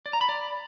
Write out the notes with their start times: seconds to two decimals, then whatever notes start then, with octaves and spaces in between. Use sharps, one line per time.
0.06 D5
0.13 A#5
0.21 B5
0.29 D5